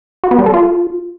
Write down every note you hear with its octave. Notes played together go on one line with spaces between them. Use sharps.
F#4
B3
G3
A4
F4